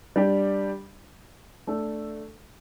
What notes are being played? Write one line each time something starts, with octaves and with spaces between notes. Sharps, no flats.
G3 D4 G4
A3 D4 A4